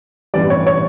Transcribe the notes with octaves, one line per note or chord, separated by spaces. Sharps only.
A1 G2 E3 G3 D5
C#5
C#5